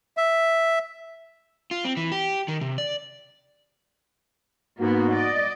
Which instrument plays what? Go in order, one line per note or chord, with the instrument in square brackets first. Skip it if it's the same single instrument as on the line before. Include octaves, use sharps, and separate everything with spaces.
[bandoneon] E5
[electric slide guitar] F4
C4
E3
G4
D#3
C3
D5
[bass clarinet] G#2 [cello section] A#3 B3 [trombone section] F#4
[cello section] D5 D#5